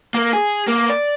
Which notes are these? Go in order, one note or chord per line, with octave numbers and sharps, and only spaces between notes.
A#3
G#4
A#3
D5